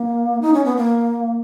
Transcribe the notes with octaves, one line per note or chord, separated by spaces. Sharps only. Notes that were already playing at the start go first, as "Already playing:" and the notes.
Already playing: A#3
D#4
C#4
B3
A#3